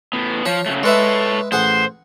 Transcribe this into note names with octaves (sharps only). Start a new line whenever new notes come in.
A2 B3
F3 C#5
C#3 F#3 A3
G#3 A4 B4 C#5 E5
A1 G#4 C5 F#5